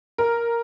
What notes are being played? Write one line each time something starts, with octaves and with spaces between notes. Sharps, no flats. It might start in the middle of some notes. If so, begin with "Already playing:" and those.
A#4